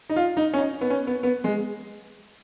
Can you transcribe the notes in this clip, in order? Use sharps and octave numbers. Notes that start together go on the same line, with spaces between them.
D#4
F4
D#4
C#4
D#4
B3
C#4
B3
B3
G#3